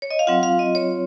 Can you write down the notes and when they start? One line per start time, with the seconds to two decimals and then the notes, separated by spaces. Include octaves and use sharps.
0.02 C#5
0.11 D#5
0.19 F5
0.27 F#3 C4 F4 F#5
0.43 F5
0.59 D#5
0.75 C#5